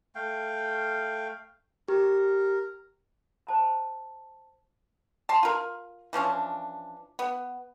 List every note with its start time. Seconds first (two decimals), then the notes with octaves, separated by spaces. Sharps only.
0.15 A3 F5 G5
1.88 G4 A#4
3.47 C5 A5 A#5
5.29 A5 C6
5.43 F4 A#4
6.13 E3 F3 C#4 D4
7.19 B3